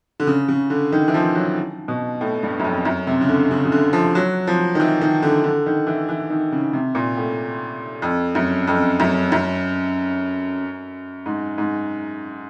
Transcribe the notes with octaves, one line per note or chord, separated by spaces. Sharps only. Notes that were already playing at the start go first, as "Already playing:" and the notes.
D3
C#3
C#3
D3
D#3
E3
F3
F#3
B2
A2
G2
F#2
F2
F#2
C3
C#3
D3
C#3
C#3
D3
F3
F#3
F3
D#3
E3
D#3
D3
D3
D#3
E3
E3
D#3
C#3
C3
A#2
A2
F2
F#2
F2
F#2
F#2
G#2
G#2